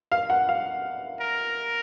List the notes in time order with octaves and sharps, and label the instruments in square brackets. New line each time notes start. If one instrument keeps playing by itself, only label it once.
[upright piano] F5
F#5
F5
[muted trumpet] A#4